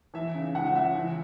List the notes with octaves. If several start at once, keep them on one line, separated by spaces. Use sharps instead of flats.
E3 E5
C#3
C#2 F#5
C#2 E5
E3